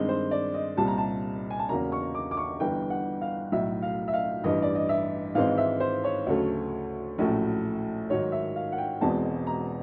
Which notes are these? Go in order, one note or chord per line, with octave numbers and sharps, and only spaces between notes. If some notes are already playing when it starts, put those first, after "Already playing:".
Already playing: G2 D#3 G#3 C4
C5
D5
D#5
C2 A#2 G3 C4 A5
A#5
A5
G#5
A5
E2 C#3 F#3 A#3 C#4 A#5
C#6
D6
D6
C#6
G1 G2 E3 G5
F#5
F5
B1 A2 F#3 E5
F5
E5
F5
A1 G2 E3 D#5
D5
D#5
E5
G#1 G#2 E3 G#3 C4 F5
E5
C5
C#5
D2 C#3 F#3 A3
A#1 A2 F#3 A3 C#4
G#2 D#3 F#3 C#5
E5
F5
F#5
G5
E1 E2 B2 G#3 C4 A5
A#5